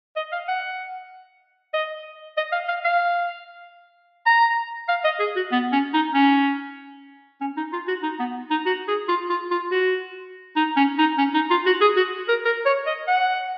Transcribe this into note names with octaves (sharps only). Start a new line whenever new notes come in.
D#5
F5
F#5
D#5
D#5
F5
F5
F5
A#5
F5
D#5
G#4
F#4
B3
C#4
D#4
C#4
C#4
D#4
F4
F#4
D#4
B3
D#4
F#4
G#4
F4
F4
F4
F#4
D#4
C#4
D#4
C#4
D#4
F4
F#4
G#4
F#4
A#4
A#4
C#5
D#5
F#5